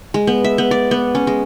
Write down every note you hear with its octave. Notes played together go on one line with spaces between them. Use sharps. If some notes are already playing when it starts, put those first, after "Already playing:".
G#3
B3
E5
B3
D5
B3
C#4
G#3